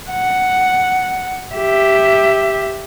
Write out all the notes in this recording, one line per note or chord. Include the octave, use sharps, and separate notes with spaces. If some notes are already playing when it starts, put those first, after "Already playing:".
F#5
G4 E5